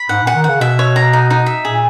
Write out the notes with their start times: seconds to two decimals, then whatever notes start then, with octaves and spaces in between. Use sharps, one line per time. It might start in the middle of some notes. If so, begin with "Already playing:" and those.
Already playing: B5
0.09 G#2 F#5
0.23 A#2 F#5
0.36 D#3
0.44 C#3 F#5
0.61 B2 E5
0.79 C#5
0.96 A#5
1.13 D#4
1.30 D#4
1.46 E5
1.65 A#2 G#4